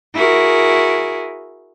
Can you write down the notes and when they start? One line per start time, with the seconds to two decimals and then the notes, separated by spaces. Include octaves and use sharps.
0.15 E4 F#4 G#4 A#4